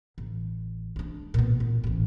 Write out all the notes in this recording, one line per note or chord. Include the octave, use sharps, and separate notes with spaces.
A1
G#3 D4
A#2 B3
A#2
A1 C#4